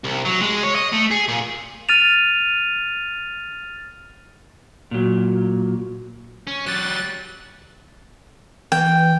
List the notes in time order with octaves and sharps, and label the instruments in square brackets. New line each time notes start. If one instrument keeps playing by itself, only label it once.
[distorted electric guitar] C2
F#3
G#3
C#5
D#5
A3
G#4
A#2
[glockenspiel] F6 A6 D#7 F7
[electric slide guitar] A#2 F#3
[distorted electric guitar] C#4
[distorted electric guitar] F#3 G4 [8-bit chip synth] F#6 A6
[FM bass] E3 [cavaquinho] G5